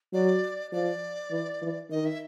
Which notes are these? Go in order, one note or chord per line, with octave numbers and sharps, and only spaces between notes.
F#3 D5
F3 D5
E3
E3
D#3 D#5
E5